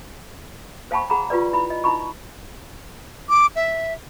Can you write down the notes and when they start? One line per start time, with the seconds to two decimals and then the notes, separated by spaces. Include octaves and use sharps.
0.91 C5 F5 G5 A5 B5 C#6
1.10 G#4 F#5 A#5 B5
1.30 F4 G4 B4 D5
1.53 E4 B5
1.70 D#5
1.84 D#4 E4 B5 C#6
3.29 D6
3.56 E5